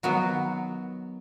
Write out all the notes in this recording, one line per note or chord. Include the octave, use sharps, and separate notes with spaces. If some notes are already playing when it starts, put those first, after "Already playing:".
D#3 F#3 B3 F#4